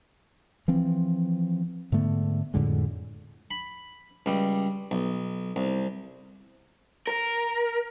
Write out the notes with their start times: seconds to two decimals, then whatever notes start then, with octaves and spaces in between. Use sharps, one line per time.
0.68 E3 F3 C4
1.92 G#2 D3 A3 B3
2.54 F2 A2 D3 G#3
3.51 B5
4.26 C#2 G3
4.91 B1
5.56 C2
7.07 A#4